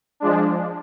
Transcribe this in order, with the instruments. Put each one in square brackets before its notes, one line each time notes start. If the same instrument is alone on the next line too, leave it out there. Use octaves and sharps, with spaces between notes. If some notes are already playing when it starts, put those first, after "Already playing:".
[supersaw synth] F3 G#3 D4